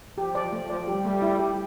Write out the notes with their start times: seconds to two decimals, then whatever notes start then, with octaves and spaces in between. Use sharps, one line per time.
0.18 F3 G4
0.35 D5
0.52 F3 A3
0.70 D5
0.87 G3 G4
1.05 A3
1.22 E4
1.40 G4